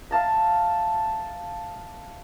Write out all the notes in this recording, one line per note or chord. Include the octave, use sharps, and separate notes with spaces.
E5 F5 A5 A#5